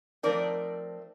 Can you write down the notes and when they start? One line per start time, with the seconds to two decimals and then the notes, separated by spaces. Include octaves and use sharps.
0.23 F3 A3 C4 D#4 A#4 D5